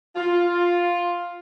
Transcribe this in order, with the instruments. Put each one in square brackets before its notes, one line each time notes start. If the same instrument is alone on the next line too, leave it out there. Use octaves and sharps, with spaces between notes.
[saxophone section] F4